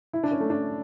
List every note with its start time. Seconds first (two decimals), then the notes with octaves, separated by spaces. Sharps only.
0.13 E4
0.23 D4
0.31 C#4
0.40 A3
0.50 D4